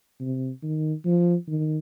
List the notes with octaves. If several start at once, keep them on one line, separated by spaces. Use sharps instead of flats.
C3
D#3
F3
D#3